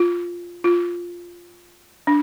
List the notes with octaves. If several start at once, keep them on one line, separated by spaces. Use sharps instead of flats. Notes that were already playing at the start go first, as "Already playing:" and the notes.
Already playing: F4
F4
D4